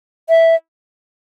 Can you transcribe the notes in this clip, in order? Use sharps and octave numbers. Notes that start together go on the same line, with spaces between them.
E5